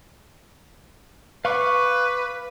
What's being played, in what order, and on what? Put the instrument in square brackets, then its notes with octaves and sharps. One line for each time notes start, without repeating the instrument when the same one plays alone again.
[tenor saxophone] B4 [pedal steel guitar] F5 C#6 D6